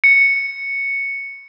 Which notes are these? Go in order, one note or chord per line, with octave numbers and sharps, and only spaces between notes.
C#7